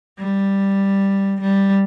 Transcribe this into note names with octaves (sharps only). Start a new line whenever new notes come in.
G3
G3